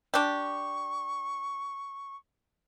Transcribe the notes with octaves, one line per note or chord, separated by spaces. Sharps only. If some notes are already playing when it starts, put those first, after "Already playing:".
D4 G4 C#6